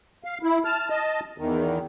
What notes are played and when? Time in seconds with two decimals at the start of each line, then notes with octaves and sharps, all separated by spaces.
0.24 F5
0.43 E4
0.65 A5 F6
0.90 D#5 A5
1.38 E2 D#3